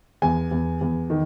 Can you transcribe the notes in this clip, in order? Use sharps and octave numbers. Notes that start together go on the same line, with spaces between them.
E2 G#5
E2
E2
D#3